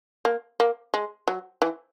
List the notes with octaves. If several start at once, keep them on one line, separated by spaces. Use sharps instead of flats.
A#3
A#3
G#3
F#3
E3